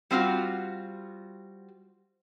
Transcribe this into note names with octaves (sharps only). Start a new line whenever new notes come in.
G3 C4 F4 F#4